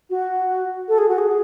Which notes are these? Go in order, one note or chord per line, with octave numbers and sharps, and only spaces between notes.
F#4
A4
G#4
F#4
G#4